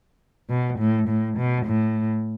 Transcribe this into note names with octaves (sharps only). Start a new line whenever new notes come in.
B2
A2
A2
B2
A2